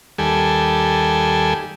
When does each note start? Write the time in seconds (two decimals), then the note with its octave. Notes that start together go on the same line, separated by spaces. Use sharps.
0.19 D#2 G3 A4 G#5